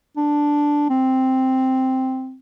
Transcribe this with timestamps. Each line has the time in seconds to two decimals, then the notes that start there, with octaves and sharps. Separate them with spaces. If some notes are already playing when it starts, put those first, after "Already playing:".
0.17 D4
0.90 C4